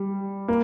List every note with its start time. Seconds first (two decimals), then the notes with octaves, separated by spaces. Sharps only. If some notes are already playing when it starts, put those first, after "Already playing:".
Already playing: G3
0.48 A#3